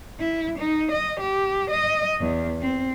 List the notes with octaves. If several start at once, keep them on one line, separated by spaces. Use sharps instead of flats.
E4
D#4
D#5
G4
D#5
E2
C4